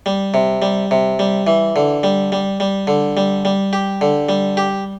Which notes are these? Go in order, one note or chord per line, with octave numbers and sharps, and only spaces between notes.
G3
C3
G3
C3
G3
E3
D3
G3
G3
G3
D3
G3
G3
G4
D3
G3
G4